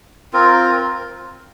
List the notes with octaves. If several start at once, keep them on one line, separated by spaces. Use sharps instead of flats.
C4 F4 A#4
A#4